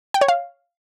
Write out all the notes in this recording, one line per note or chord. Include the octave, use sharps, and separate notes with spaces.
G5
C#5
F5